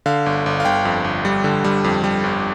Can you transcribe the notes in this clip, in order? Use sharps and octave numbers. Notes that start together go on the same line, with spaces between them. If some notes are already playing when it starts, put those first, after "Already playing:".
D3 F5
G1
G1
F5
G1 G5
F2
G1
G3
D3
G3
F2
G3
G1